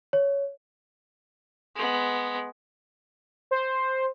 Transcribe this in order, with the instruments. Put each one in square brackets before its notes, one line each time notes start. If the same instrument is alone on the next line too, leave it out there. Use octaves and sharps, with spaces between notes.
[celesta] C#5
[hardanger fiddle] G#3 B3
[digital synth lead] C5